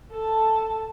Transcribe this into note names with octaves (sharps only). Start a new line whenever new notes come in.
A4 A5